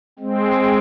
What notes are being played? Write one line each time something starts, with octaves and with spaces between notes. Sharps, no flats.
G#3 C4